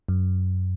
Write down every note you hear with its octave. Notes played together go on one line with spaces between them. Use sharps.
F#2